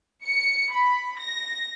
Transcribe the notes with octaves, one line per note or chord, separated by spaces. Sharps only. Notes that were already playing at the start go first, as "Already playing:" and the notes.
C#7
B5
A#6